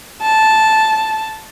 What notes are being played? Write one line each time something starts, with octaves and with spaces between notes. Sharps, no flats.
A5